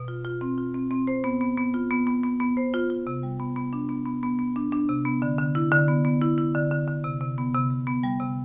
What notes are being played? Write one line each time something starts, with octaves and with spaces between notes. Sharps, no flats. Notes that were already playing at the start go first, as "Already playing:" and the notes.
Already playing: B2
F4
F4
C4
F4
C4
C4
C5
B3
B3
B3
F4
B3
B3
B3
B3
C5
F4
F4
C3
G3
B3
B3
D4
B3
B3
B3
B3
D4
D4
C3
B3
D3
D3
E4
D3
B3
B3
E4
E4
D3
D3
D3
C3
C3
B3
C3
C3
B3
G3
C3